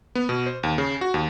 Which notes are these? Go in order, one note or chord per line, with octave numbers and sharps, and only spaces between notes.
B3
B2
C5
D#2
C#3
F#4
D#2